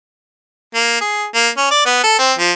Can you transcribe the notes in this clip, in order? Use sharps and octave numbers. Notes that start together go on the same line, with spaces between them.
A#3
G#4
A#3
C#4
D5
B3
A4
C4
F3